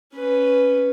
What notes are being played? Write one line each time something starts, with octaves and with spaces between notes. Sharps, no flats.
C#4 B4